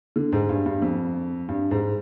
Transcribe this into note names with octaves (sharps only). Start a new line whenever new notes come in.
D3
G#2
G2
G2
F2
G2
G#2